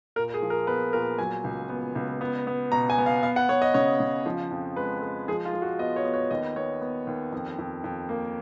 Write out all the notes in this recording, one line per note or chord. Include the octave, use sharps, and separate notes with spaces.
A#2 A#4
G#4
F3
A#4
B3 B4
A#2 A#4
F#3 G#5
C#2
B3
C#2
B3
B3
B2 A#5
G#5
B3
F5
B3 F5
F#5
B3 C#5
D#5
C#3 C#5
C#3
F3
F2
G#3 B4
G#3
F3 G#4
F4
F3
F#4
B3 D#5
C#5
B3
C#5
D#2 D#5
B3 C#5
B3
D#2
F2
F2
F2
A#3